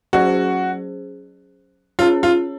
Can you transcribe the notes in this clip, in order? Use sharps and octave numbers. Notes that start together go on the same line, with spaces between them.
F#3 C#4 F#4 G#4 C5
C#4 F4 G#4 C#5
F4